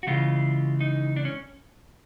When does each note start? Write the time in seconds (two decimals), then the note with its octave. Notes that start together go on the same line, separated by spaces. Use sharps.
0.03 F#4
0.07 C#3 E3 G#3 F4
0.81 D#4
1.16 D4
1.25 C#4